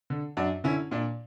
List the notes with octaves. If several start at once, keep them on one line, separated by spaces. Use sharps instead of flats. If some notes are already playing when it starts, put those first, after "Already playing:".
D3
F#2 D4 F#4
D3 C#4 E4
A#2 D4